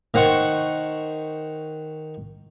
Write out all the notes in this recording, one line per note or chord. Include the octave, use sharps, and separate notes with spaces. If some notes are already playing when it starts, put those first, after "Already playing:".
D#3 C5 F#5 C#6